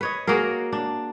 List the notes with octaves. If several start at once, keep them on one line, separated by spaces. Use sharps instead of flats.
B4 C#5 D#5
A#3 F#4 G#4 A#4
D4